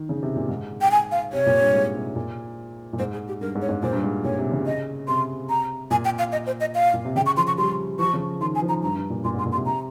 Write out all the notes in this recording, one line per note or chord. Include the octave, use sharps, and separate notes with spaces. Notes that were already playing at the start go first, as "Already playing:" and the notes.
Already playing: D#3
C#3
C3
A#2
G#2
G5
G#5
F5
C3 C#5
A#2
G2
G#2
C3
A#2
A#2
G#2 C5
G#4
G4
G2 A#4
G#2
C#5
G#2
A#2 C5
G2
G#2
A#2 C#5
C3
C#3
D#5
C3 C6
A#5
A#2 G#5
G5
F5
D#5
C5
D#5
F5
A#2
C3
C#3 G5
C#6
F3 C6
C#6
G3 C6
F3 C#6
C#3
D#3 C6
G#5
F3
A#5
G2 A#5
G2
A#2
A#2 C6
G#2
C6
A#2
C6
C3
A#5